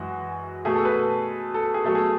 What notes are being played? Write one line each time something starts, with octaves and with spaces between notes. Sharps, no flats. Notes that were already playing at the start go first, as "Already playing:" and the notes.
Already playing: F#2 E3 G#3 F#4
B2 A3 G#4
A4
B4
A4
G#4
B2 F#3 A3 A4
G#4